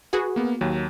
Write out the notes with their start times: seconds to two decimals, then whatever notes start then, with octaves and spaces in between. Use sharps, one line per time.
0.13 F#4 G#4 B4
0.36 A#3 B3
0.61 D#2 F#3